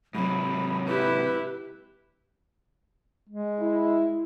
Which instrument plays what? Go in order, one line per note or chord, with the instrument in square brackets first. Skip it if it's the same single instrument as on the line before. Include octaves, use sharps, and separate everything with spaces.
[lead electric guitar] G#2 C3 [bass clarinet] F#3 [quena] B5
[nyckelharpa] E4 G4 [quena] B4
[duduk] G#3
[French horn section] E4